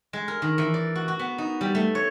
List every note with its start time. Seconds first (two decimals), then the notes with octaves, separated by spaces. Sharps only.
0.13 G#3
0.28 A#4
0.42 D#3
0.58 E3
0.74 D5
0.95 F#4
1.08 F#4
1.19 B3
1.38 D#4
1.61 G3
1.75 A3
1.95 C#5